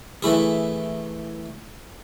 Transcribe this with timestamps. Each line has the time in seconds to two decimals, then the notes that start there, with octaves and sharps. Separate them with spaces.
0.23 E3 A3 E4 G#4